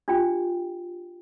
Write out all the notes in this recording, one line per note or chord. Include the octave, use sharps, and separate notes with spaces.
D4 F4 G4 G5